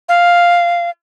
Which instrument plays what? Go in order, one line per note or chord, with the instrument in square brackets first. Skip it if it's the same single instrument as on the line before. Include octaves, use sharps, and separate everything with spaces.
[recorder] F5